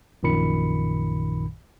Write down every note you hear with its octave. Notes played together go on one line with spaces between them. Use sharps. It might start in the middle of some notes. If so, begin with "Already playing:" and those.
A#1 F#2 A#2 D#3 B5 C#7